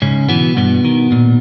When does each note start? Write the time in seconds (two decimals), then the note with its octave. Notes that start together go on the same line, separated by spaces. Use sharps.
0.02 G#2 C#3 C#4
0.29 B2 E3 B3
0.57 G2 B2 B3
0.85 D#3
1.12 A#2